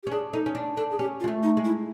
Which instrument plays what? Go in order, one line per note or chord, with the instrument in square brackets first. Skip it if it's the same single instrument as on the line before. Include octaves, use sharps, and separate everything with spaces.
[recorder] G4
[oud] C#4
[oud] D4 [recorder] G#4
[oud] D#4 [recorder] A4
[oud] C#4
D4
[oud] D4 [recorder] A4
[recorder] G#4
[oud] C#4 [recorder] G4
[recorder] F4
[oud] G#3
A3
[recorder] D#4
[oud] G#3
[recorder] E4